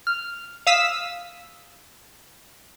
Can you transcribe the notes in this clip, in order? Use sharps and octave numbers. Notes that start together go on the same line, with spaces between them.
F6
F5 D#6 E6 B6